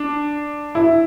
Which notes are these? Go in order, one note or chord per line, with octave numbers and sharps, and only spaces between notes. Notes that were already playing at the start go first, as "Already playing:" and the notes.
Already playing: D4
E4